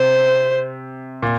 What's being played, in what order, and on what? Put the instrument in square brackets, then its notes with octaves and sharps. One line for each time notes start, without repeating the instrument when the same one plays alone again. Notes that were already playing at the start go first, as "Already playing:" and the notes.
Already playing: [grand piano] C3 [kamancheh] C5
[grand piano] A#2